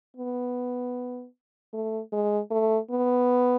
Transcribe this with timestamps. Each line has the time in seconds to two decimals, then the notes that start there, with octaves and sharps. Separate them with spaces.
0.17 B3
1.74 A3
2.12 G#3
2.51 A3
2.91 B3